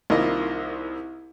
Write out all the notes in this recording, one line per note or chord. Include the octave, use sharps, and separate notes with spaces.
C2 D#3 A#3 E4 F4 D#5